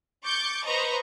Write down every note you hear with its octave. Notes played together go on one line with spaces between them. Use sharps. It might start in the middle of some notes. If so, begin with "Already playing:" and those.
C#6 D6 G6 A6 C#7
B4 C5 D#5 A#5 C#6